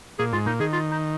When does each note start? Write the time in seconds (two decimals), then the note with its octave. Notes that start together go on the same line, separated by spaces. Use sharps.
0.19 A#2 G#4
0.33 G#2 F4
0.46 A#2 D#4
0.60 D#3 G#4
0.73 F4
0.92 D#4